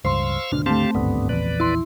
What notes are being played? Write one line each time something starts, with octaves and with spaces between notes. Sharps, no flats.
C#2 G2 C5 F5 C6 C#6 E6
G#1 D2 B2 D4 F6
A3 C4 G4 F5 A5
G#1 D2 G2 D3 B3
A#1 E2 B4 D5
E4 C6